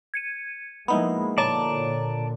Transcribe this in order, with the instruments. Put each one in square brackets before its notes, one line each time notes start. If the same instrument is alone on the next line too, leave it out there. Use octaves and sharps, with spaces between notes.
[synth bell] G#6 C#7 D#7
[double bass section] F3 G#3 A#3 [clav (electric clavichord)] B3 D#4 E4 [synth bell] B5
[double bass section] A#2 D3 [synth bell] C#5 A#5 [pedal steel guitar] D5 A5